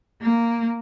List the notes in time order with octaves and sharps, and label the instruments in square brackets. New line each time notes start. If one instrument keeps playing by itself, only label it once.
[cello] A#3